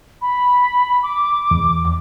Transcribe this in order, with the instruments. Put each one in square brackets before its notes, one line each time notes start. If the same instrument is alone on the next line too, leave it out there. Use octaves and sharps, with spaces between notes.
[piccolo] B5
D6
[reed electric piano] E2